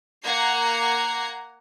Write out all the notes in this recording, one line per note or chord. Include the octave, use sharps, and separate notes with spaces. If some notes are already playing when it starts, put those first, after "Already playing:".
A#3 F#5 A#5 G#6 C7